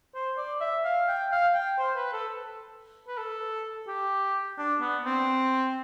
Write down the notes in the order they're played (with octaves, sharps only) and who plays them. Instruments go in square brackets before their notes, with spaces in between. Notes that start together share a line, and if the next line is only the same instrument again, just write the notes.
[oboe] C5
D5
E5
F5
G5
F5
G5
C5
B4
A4
B4
A4
G4
D4
B3
C4